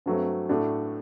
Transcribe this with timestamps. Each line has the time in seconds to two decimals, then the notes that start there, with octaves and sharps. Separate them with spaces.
0.06 G2 F#3 A3 C4
0.49 A2 A3 D4 F#4